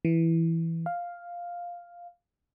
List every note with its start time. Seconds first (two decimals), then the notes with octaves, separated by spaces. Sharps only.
0.05 E3
0.86 F5